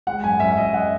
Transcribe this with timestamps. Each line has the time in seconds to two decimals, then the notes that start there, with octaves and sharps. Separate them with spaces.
0.07 G#3 F#5
0.23 F#2 G#5
0.40 F#2 E5
0.51 E5
0.57 F#2 D#5
0.74 F#5